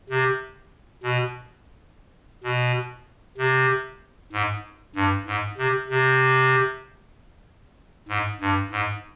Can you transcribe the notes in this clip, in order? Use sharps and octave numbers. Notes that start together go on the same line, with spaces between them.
C3
B2
B2
C3
G#2
G2
G#2
C3
C3
G#2
G2
G#2